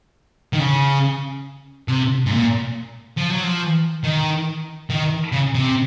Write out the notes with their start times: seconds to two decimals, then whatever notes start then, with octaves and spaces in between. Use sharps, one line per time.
0.53 D#3
0.59 C#3
1.88 C3
2.26 G#2
2.32 A#2
3.18 F3
3.30 F#3
3.44 F3
4.04 D#3
4.90 D#3
5.32 C#3
5.55 C3